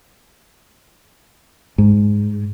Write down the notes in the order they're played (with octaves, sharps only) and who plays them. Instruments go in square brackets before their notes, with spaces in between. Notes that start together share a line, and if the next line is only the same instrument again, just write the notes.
[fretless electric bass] G#2